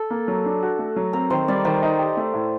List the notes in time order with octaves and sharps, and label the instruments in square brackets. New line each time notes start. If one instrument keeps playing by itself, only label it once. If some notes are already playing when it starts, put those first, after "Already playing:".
Already playing: [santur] A4
[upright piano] A#3
F#3
D4
F#4
A3
F#3
[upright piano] C4 [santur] A#4
[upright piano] D#3 [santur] C5
[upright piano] G3 [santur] D5
[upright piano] D#3 [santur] C5
[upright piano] D#4
G4
A3
A2